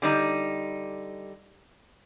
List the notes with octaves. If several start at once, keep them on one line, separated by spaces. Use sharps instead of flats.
D3 G3 D#4